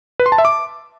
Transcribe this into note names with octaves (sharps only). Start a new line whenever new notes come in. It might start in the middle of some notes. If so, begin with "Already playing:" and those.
B4
C6
A5
E5
D6